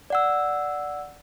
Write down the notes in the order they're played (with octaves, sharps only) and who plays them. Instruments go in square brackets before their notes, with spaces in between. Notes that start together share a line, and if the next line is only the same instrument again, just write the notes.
[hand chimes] D5 F#5 E6